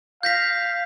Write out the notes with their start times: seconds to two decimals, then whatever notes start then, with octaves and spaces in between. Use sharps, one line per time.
0.23 F5 G6 A#6 B6